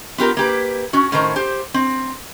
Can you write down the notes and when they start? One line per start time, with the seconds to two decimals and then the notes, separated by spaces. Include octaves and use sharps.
0.18 B3 F4 G4 A#4
0.37 A#3 G4 B4
0.93 C#4 F#4
1.12 A2 D#3 C#4 A#4 C5
1.36 G4 C5
1.74 C4